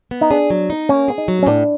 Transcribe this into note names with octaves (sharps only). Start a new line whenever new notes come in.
B3
D#4
D4 G#4
F#3
D#4
A#3 C#4
G#4
D#4
F#3
C#4
A2 D4